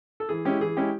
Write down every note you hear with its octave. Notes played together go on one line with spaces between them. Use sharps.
A4
E3 G#4
G#3 C#4 E4 G4
E3 G#4
G#3 C#4 E4 G4